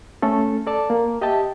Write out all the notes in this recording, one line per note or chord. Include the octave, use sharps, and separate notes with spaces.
A3 C#4 A4
A4 D5 A5
A#3
G4 D#5 E5 G5 A5